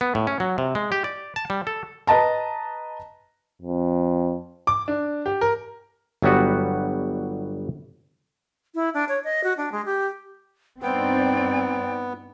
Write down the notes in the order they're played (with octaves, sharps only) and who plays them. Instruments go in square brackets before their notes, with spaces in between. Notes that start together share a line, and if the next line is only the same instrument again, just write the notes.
[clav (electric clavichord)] B3
A2
C#4
F#3
C3
G#3
G4
D5
A5
G3
A4
[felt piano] B4 D#5 A5 A#5
[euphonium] F2
[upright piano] D6
D4
G4
A#4
[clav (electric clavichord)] G1 F#3 G3 B3 F#4
[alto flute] E4
D4
C#5
D#5
F#4
D4
G#3
G4
[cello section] G2 D#4 D5 [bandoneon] B3 [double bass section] C4 [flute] G5